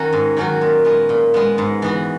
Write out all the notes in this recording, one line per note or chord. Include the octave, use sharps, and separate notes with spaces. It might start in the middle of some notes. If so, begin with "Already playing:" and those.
Already playing: D#3 C#4 F#4
G#2
D#3 F#3 C#4 F#4
A#2
G#3 B3
A#2
G#3 B3
G#2
E3 B3 F#4